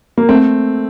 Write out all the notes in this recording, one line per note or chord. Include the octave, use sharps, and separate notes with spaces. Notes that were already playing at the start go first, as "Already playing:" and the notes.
A#3
A3 C4